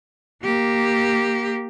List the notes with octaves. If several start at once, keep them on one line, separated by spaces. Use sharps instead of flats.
A#3 G4